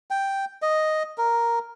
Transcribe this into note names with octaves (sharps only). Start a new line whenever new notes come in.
G5
D#5
A#4